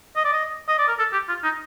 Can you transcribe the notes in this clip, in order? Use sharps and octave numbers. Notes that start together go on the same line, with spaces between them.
D#5
D5
D#5
D#5
D5
A#4
A4
G4
F4
D#4